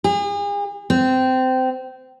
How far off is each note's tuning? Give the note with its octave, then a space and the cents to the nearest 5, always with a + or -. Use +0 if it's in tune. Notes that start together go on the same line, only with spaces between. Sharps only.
G#4 -40
C4 -20